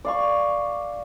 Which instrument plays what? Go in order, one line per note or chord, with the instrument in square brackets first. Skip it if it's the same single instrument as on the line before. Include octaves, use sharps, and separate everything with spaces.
[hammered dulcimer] D5 F5 C#6